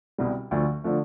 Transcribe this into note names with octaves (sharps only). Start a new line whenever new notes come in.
C2 B2 G3
D2 D3 F3 A3
D3 F3 A3